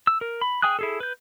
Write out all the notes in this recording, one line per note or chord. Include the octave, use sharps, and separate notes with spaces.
E6
A#4
B5
G#4 G5 G#5 D#6 F#6
E4 G#4 A4
B4 G6